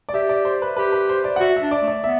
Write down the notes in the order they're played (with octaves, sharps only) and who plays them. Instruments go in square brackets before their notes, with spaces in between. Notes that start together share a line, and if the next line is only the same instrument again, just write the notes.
[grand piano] D5
[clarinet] G4 [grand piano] E5
[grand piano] D5
C5
B4
[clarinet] G4 [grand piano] B4
[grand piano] B4
C5
D5
F#5
[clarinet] F#4 [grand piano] E5
[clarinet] D4 [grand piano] E5
[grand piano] D5
[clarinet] A3
[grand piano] D5
[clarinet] B3 [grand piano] E5